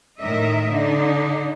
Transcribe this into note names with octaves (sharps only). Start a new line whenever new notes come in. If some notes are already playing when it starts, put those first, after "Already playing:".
A2 D#3 A#4 D#5 E5
D3 D#4